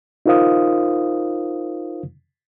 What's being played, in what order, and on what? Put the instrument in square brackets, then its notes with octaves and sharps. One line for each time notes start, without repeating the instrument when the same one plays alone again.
[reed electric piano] D#4 F4 A#4 C5 F5 D#6